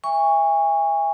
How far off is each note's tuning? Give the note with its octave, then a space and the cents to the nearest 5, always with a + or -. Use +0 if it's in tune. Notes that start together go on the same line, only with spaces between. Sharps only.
E5 +0 G#5 -35 C#6 +10